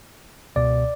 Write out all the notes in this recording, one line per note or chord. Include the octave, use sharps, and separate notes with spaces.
C#2 B2 D5